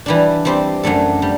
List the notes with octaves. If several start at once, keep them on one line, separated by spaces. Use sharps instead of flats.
E3 G3 D4
G3 C4 G4
F#2 F#3 A3 D4 A4
G3